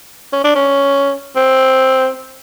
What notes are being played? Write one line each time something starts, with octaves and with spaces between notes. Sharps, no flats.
C#4
D4
C#4
C4